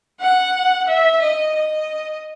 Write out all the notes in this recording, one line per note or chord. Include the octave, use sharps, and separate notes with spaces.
F#5
E5
D#5
D#5